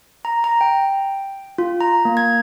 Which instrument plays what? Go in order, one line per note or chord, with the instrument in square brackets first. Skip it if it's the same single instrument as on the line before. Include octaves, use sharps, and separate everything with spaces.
[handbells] A#5
A#5
G5
F4
A#5
A#3
G#6